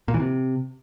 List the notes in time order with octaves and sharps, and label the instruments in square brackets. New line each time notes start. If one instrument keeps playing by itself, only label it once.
[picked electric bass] A#2
E3
C3